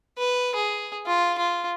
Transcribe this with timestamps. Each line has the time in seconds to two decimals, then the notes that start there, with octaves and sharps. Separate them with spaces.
0.18 B4
0.55 G#4
1.06 F4
1.38 F4